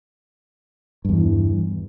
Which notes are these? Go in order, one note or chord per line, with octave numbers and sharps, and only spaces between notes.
E2 G2 E3